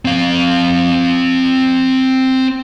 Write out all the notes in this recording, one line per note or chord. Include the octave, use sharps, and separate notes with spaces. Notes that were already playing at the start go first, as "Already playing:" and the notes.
C4 F5